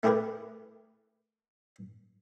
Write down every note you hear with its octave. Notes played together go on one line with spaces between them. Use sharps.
A3 E4 G4 G#4 A#4 B4